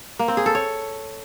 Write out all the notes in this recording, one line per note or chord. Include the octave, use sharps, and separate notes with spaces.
A#3
C4
G#4
A4
C#5